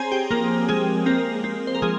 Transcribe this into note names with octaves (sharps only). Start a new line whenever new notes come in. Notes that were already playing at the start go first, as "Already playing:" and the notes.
Already playing: C4 G#4 C5 C#5 G#5 A#5 C6
G4 G5
F3 A#3 A#4
F3 G#3 G#4
A#3 C4 A#4
C4
C5
A#4
F3 G#3 G#4